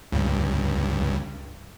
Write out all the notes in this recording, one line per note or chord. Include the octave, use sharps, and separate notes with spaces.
C#2 G2